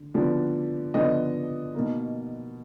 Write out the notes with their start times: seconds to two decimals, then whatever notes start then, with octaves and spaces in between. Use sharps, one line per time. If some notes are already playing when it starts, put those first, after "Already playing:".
Already playing: D3
0.14 D3 F3 B3 D4
0.94 D3 F3 B3 D4 D#5
1.75 B2 A#3 D#4